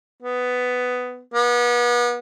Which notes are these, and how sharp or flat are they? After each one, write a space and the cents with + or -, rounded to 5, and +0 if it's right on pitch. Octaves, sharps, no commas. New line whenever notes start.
B3 +10
B3 -35